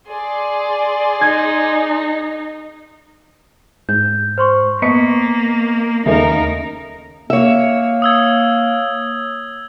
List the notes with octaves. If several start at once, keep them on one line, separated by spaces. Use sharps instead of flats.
G#4 D5 C6
D#4 G#6
G#2 G6
C5 C6 C#6
A#3 B3 D#5 C#6 B6 C#7
D#2 C#3 A3 A#3 D#4 A#4 E5
A#3 C#5 E5
D#6 E6 G#6